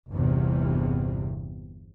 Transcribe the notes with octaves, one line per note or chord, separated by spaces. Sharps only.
G1 E2 C3